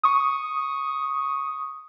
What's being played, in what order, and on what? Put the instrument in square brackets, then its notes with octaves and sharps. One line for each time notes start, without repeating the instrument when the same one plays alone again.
[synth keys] C#6 D#6